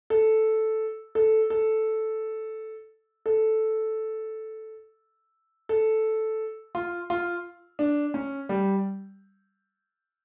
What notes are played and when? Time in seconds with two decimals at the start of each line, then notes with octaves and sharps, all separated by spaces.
0.10 A4
1.15 A4
1.50 A4
3.26 A4
5.69 A4
6.75 F4
7.10 F4
7.79 D4
8.14 C#4
8.49 G3